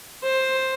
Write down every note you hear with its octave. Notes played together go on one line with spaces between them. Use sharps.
C5